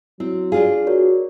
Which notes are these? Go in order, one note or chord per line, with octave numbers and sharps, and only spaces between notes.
F#3 C4 E4
D4 F4 G#4 F5
F#4 A#4 C#5 D5